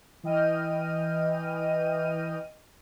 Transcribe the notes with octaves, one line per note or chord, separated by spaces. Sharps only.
E3 D#5 G5 F6 D#7